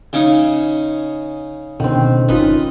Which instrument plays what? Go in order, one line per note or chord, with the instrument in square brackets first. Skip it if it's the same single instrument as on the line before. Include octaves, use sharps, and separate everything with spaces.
[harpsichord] C#3 C#4 D#4
[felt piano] C#2 D3 [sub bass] B2 [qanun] D#3 C4
[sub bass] G1 [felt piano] C#4 F4 [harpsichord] D#4 B4